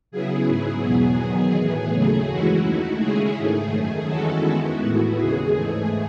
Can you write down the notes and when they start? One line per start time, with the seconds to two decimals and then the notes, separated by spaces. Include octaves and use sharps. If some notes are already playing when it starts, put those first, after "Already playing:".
0.11 C#3 F#3 B3 E4 G#4
0.47 G#2 F#3 B3 E4 G#4
0.83 E2 B2 F#3 B3
1.19 E2 D#3 F#3 B3
1.56 A2 E3 B3 G#4
1.92 D#2 C#3 F#3 A3
2.28 F#2 E3 G#3 C#4 E4 F#4
2.65 D#2 D#3 A3 E4 F#4
3.00 C#3 G#3 C#4 E4 G#4
3.37 G#2 D#3 A3 G#4
3.73 F#2 D#3 A3 G#4
4.09 E2 D#3 G#3 C#4 E4 F#4 A4
4.45 D#3 G#3 B3 E4 F#4
4.82 A2 E3 B3
5.18 D#2 C#3 G#3 G#4
5.54 G#2 E3 A3